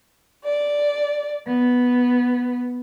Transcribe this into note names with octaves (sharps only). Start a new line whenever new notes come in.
D5
B3